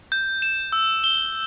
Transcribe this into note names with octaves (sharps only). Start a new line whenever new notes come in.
G6
E7
E6
G7